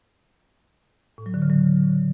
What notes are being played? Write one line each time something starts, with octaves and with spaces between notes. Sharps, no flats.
A2
F#3
D3
C#3
F#3